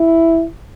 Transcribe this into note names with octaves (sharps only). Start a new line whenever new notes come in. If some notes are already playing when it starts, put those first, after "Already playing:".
Already playing: E4